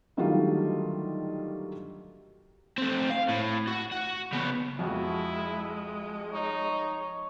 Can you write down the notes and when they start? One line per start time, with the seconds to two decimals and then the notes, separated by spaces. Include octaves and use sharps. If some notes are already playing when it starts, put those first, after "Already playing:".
0.17 D3 D#3 F#3 G3 A3 F4
2.78 A3 C4
3.10 F5
3.28 A2
3.67 F#4
3.92 F#4
4.33 C#3 B3
4.79 F2 G#3 E4 F#4
6.33 D#4 C#5